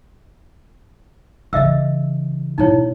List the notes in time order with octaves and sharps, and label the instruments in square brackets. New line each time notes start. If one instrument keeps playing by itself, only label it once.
[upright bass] C#3 E3 [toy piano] D#5 E5 E6
[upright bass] B2 B3 [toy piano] D#4 E4 C#5